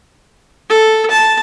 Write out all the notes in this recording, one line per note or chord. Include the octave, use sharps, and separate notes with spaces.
A4
A5